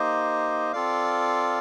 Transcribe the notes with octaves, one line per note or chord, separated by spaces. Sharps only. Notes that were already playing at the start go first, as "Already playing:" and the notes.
Already playing: A#3 D#4 G4 C5 D#5
C4 F4 A4 D5 F5